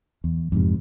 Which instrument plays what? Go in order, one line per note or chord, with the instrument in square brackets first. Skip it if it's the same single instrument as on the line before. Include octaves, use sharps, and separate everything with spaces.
[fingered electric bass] E2
F2 G#2 C3